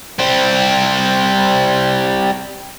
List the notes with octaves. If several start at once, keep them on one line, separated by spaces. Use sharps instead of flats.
G3 C4